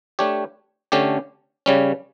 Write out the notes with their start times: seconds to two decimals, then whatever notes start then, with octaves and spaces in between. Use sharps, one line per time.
0.19 A3 D4 G4 C#5
0.92 D3 A3 C#4 G4
1.66 C#3 G3 C#4